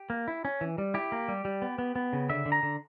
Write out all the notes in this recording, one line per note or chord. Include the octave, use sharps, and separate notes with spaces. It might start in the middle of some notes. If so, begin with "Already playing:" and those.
Already playing: G4
A#3
E4
C#4
E3
G3
E4 G4
A#3
G3
G3
B3
B3
B3
C#3
D3 E5
D3
A#5
D3